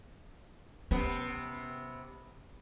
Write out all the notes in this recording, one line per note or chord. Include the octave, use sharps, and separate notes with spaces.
C3 B3 C#4